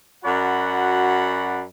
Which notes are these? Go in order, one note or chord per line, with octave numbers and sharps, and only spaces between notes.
F#2 F#4 D5 F#5 B5